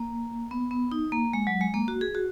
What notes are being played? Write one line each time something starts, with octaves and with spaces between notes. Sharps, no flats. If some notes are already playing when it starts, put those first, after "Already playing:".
Already playing: A#3
B3
B3
D#4
A#3
G#3
F#3
G#3
A#3
F#4
G#4
F#4